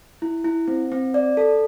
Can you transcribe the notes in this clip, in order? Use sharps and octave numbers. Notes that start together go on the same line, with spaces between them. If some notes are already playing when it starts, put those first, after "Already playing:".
E4
E4
C4
C4
D5
A4